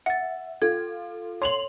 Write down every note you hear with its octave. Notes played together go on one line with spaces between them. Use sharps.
E5 F#5 A6
F4 A4 G#6
C#5 C6 F7 F#7